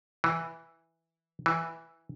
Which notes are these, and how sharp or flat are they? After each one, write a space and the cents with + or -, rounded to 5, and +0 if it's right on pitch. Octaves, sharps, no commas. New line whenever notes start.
E3 -5
E3 -5